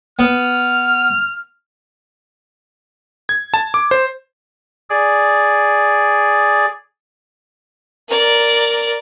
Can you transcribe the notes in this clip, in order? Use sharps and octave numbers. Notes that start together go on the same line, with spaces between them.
B3 F6
G#6
A5
D6
C5
G#4 D5
A#4 D5